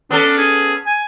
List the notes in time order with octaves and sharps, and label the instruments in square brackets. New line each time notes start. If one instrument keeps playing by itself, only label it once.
[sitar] B3 C#4 A4 [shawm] D4
[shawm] G#4
G#5